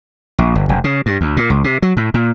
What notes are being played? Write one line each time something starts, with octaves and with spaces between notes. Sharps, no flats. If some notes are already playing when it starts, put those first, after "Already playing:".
A#1
G1
F1
C#3
G2
D2
A#2
C#2
C3
F#3
A2
A#2